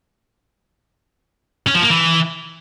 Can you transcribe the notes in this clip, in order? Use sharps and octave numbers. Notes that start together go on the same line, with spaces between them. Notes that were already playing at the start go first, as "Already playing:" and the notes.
C#4
F3
A#3
E3